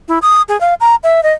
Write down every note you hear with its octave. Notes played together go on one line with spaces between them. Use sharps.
E4
D#6
G#4
F5
A#5
E5
D#5